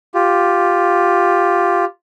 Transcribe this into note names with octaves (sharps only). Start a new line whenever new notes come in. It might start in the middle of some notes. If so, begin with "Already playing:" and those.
F4 G4